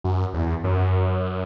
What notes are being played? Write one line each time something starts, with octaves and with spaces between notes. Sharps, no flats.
F#2
E2
F#2